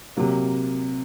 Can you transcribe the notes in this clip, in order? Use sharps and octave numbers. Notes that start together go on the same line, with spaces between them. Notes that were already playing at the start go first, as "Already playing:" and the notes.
C3 F#3 A#3